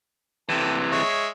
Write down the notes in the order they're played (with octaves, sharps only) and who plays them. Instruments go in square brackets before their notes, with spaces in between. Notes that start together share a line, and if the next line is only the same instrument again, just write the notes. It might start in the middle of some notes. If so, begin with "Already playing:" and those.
[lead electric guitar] C3 E3 [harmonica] G4 A4
[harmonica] G#3 C#5 E5